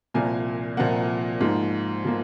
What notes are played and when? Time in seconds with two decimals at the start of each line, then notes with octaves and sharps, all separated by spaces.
0.14 C2 A#2 F3 A#3 G#5
0.77 C2 A#2 F3 A#3 F#5
1.41 G#2 F3 A#3
2.05 F3 A#3